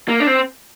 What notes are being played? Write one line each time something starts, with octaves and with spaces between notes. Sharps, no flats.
A#3
D4
C4